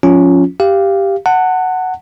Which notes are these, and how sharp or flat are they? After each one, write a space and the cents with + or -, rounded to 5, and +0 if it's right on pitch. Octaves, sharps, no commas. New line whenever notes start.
F3 +20 C#4 +5 F4 +0
G4 +0 F5 -15
F#5 +0 A5 +35